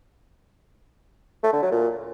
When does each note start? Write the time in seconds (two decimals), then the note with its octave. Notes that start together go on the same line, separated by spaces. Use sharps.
1.43 A3
1.53 D3
1.62 F#3
1.72 A#2